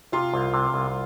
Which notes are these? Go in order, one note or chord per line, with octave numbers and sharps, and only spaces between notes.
C3 F4
C2
C3
C2